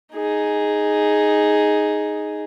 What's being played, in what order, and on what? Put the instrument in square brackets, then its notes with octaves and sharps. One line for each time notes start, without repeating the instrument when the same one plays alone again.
[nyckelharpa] D#4 G#4